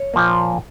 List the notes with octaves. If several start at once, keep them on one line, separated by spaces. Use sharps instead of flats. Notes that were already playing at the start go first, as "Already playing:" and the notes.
Already playing: C#5
A#2 F3 A#3